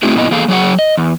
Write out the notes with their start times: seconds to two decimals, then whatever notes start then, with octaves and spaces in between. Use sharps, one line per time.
0.03 A3 C4 D#4 E4 F#4 G#4
0.16 A#2 B3 E4 D#5
0.31 E2 A#3 G#4 A4 F5
0.48 F#3 G#4 C#5 F#5
0.79 D#5
0.97 E2